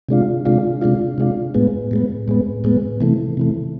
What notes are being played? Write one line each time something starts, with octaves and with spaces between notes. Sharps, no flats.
C3 G#3 D4 F4
C3 G#3 D4 F4
C3 G#3 D4 F4
C3 G#3 D4 F4
A2 G#3 B3
A2 G#3 B3
A2 G#3 B3
A2 G#3 B3
C3 E3 A3
C3 E3 A3